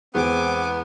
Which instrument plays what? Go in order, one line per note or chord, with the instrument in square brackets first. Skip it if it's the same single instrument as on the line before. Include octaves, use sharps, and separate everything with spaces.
[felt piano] E2 G#3 [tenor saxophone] B3 [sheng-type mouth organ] C4 [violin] G#5 D6